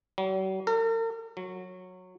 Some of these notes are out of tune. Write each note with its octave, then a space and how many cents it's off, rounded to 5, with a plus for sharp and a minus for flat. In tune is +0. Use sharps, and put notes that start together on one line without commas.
F#3 +45
A#4 -45
F#3 -15